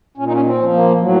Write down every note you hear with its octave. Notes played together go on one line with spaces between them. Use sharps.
A#2 C#4
D#4
C#4
C4
F3
A#3
A2 F#3